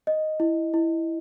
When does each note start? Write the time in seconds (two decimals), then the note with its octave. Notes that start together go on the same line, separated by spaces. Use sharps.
0.07 D#5
0.40 E4
0.74 E4